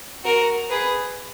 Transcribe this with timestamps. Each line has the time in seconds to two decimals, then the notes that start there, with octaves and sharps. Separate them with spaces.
0.24 F#4 A#4
0.70 G#4 B4